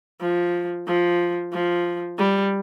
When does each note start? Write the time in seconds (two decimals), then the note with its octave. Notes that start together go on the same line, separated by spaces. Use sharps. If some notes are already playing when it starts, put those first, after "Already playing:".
0.21 F3
0.88 F3
1.53 F3
2.19 G3